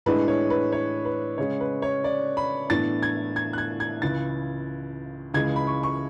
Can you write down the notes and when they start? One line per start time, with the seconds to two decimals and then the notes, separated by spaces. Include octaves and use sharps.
0.06 A2 E3 G#3 D4 B4
0.28 C#5
0.50 B4
0.72 C#5
1.05 B4
1.38 C#3 G#3 C#4 C#5
1.60 B4
1.82 C#5
2.04 D5
2.37 B5
2.70 A2 E3 B3 D4 A6
3.03 G#6
3.36 G#6
3.53 F#6
3.58 G#6
3.80 G#6
4.02 C#2 C#3 E3 A6
5.34 C#2 C#3 E3 G#3 G#6
5.56 B5
5.67 C#6
5.83 C#6